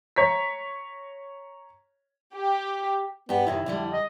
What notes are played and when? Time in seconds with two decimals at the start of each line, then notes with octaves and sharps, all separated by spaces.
0.16 C#5 A#5 B6
2.35 G4
3.29 G2 B3 G4
3.47 F#2 C3 D#3 E4
3.66 F2 D3 G3
3.92 D#5